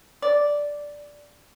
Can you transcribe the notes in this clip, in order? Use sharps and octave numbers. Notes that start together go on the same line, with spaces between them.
D5